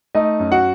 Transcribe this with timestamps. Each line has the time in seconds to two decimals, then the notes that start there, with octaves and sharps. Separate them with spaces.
0.15 A3 D#4 D#5
0.40 F#2
0.52 F#4 F#5